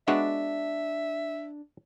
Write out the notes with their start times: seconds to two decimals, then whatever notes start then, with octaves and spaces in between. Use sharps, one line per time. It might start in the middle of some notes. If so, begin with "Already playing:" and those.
0.08 G#3 B3 D4 F#4 E5